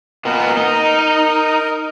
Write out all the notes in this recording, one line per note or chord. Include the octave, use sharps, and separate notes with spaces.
A#2 B3 A#4 D#5
D#4